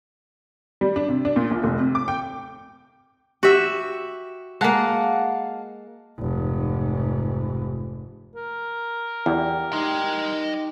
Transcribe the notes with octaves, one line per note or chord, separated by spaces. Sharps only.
G3
D4
C3
D4
A#2
A#1
F1
C3
D6
G5
F#4 G4 E5
G#3 A#3 F5 F#5 A5
F1 G#2
A#4
E2 G3
D#4 G4 D#5 C6